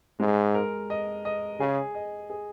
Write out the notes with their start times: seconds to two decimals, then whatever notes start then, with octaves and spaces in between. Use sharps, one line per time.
0.20 G#2 G#3
0.54 A#4
0.90 D#5
1.25 D#5
1.60 C#3 G#4
1.95 D#5
2.30 G#4